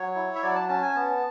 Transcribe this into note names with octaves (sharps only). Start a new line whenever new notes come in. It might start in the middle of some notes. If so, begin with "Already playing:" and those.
Already playing: F#3 C#5
E4
E5
F#3 D5
A5
C#4 A5
G#5
B3 A5